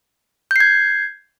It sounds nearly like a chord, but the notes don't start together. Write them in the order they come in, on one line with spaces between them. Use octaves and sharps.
G6 C7 G#6